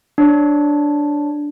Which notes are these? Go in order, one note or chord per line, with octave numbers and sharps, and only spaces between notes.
D4 C#5